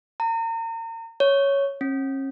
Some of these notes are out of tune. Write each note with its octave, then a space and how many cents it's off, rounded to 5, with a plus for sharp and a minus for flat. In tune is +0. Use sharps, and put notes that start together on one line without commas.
A#5 -35
C#5 +5
C#4 -40